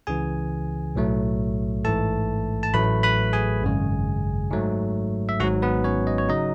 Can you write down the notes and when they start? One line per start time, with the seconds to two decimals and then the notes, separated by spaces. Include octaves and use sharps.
0.07 C#2 C#3 E3 G#4 G#5
0.96 B1 A2 F#3 A3
1.84 A1 G#2 E3 A3 A4 A5
2.63 A5
2.73 A1 A2 F#3 A3 B4 B5
3.03 B4 B5
3.33 G#4 G#5
3.62 G#1 F#2 C#3 G#3
4.51 G#2 F#3 A3
5.29 E5
5.40 G#1 G#2 F#3 F#4 F#5
5.62 B3 B4
5.84 C#4 C#5
6.07 D#5
6.18 C#5
6.29 C#3 F#3 D#4 D#5